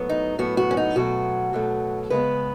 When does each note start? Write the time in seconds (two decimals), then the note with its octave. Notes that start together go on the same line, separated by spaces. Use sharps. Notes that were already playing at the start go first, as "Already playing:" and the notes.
Already playing: A2 F#3 B3
0.09 D#4
0.39 A2 F#3 B3 F#4
0.57 F#4
0.71 C#4
0.77 D#4
0.96 B2 F#3 A3 F#4
1.53 B2 F#3 A3
2.10 C#3 G#3 B3 B4